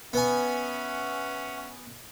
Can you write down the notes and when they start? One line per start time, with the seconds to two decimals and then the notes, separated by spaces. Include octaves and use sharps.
0.13 B3 C#4 E5 F#5 G#5